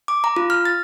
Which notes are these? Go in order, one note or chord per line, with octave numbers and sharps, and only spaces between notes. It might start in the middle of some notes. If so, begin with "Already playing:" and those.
D6
A#5
F4
F6
A6